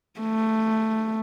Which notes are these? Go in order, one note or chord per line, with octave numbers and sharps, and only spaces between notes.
A3